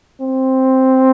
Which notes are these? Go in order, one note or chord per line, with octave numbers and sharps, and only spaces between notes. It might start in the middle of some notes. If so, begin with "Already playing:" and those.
C4